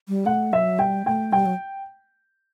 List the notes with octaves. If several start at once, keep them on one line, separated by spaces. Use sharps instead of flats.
G3
A3 F#5
F#3 E5
G3 G5
A3 G5
G3 G5
F#3